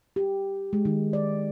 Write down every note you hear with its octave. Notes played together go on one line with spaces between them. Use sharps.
G4
G#3
D#3
D5